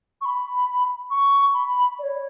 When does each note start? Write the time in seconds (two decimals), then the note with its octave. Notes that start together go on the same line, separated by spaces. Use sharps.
0.21 C#6
0.25 B5
1.10 C#6
1.54 B5
1.99 D5
2.03 C#5